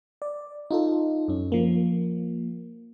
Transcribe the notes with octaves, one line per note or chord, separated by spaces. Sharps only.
D5
D#4 F4 A4
F#2 C#4
F3 A#3